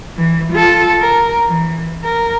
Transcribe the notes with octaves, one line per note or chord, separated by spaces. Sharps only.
E3
F4 A4
A#4
E3
A#4